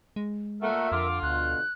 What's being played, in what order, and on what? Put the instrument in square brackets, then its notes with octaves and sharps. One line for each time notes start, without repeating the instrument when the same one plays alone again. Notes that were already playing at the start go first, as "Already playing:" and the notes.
[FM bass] G#3
[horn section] A#2 A3 [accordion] A#4 E5 [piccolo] F#5
[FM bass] F2 [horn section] D3 F4 [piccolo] D6
[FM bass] D2 [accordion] B2 [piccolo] F#6